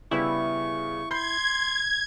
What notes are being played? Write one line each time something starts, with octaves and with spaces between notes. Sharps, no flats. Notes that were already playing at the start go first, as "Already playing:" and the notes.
C#3 G3 B3 E4 C#6
B5 C6 G6 G#6 C7